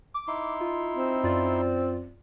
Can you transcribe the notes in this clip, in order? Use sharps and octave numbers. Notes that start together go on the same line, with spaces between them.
D6
D#4 E4 C6
F4
C4
F#2 F4 D5